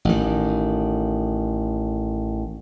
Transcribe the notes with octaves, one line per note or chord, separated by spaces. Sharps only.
A1 D#3